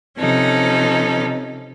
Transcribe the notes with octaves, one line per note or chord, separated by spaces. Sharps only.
C3 F3 C#4 D#4 A4